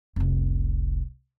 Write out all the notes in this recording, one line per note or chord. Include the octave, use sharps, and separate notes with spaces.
F1 C2